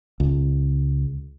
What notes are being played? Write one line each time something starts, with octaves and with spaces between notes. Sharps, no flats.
C#2